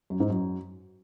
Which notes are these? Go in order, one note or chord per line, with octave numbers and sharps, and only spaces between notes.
F#2
G#2
F#2